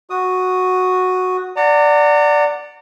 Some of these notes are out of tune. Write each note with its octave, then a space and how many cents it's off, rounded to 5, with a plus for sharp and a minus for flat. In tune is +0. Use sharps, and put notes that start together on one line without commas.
F#4 -5 D#6 +0
D5 +0 F#5 -10 A#5 -40